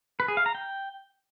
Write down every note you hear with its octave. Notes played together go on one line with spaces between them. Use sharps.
B4
G#4
F5
A#5
G5